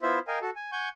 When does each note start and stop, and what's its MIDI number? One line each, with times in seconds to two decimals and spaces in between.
0.02 0.19 59
0.02 0.19 64
0.02 0.19 65
0.02 0.19 72
0.02 0.19 76
0.28 0.39 70
0.28 0.39 75
0.28 0.39 77
0.28 0.39 79
0.28 0.39 80
0.42 0.50 66
0.42 0.50 69
0.56 0.71 80
0.72 0.89 78
0.72 0.89 80
0.72 0.89 85
0.72 0.89 91